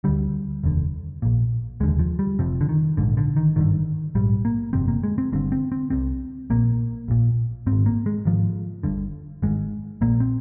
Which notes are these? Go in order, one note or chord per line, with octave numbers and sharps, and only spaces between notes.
D2 D3 G3
F1 D#2 D3
A#1 A#2
F1 D#2 D3 G#3
F3
G3
F1 F2 C3 F3
D3
D#3
A#1 G#2 D3
D3
D#3
G#1 G2 D3 D#3
A#1 G#2 G3
A#3
G1 F2 C3 C4
A#3
G#3
C4
G1 G2 D3 C4
C4
C4
C2 C3 C4
A#1 A#2 A#3
A#1 A#2
G#1 G#2 C4
A#3
G#3
G#1 G#2 F3
G1 G2 D3
G#1 G#2 G#3
A#1 A#2 A#3
C4